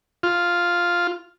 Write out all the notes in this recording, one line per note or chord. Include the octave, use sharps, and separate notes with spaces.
F4